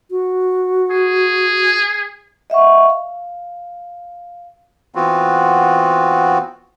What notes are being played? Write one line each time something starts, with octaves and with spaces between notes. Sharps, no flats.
F#4
G#4
D#5 E5 F#5 C#6
F5
E3 B3 C4 F4 F#4